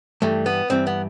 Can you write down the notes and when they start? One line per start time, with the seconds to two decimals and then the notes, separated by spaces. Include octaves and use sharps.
0.22 G2 E3 G3 A3
0.46 B3
0.70 G2 E3 G3 C4
0.87 B3